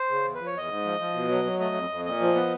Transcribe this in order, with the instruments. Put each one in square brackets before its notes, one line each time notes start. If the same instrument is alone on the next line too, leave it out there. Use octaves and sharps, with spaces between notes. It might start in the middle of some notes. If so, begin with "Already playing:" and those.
Already playing: [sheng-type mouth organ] C5
[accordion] C#3
E2
[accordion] F3 [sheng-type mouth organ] B4
[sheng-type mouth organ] C#5
[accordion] E2 [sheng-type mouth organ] D#5
[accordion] G#2
F3
F3
B2
F#3
F#3
[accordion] A3 [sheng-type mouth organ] D#5
[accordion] F2
F2
[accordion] A#2 [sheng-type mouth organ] D#5
[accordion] F3
B3